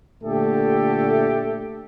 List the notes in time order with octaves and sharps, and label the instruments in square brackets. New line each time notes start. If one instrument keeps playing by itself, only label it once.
[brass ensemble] A#2 D3 A3 G4 A4